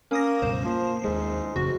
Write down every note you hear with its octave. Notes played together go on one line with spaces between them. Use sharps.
A#3 C#4 D#6 A#6
C#2 G2 B2 C5
F3 A#3
D#2 G#2 G#3
A1 F#2 C#3 F#4